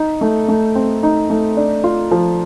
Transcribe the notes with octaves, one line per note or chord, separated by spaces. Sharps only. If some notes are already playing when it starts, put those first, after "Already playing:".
Already playing: D#4
A3
A3
C4
D#4
A3
D4
F4
F3